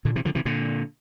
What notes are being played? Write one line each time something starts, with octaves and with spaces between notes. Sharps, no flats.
A#2 D3
C3 E3
D3 F3
C3 E3
A#2 D3